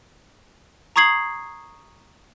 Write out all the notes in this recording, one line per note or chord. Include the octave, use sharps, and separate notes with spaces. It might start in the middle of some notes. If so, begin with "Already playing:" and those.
A#5 C#6 D#6 G#6 C7 F#7